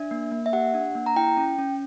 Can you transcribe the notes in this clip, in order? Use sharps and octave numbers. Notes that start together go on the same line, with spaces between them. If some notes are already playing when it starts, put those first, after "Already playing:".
Already playing: D4 E5
A#3
A#3
E5
G4 F#5
D4
A#3
A#5
E4 G5
C#4
C#4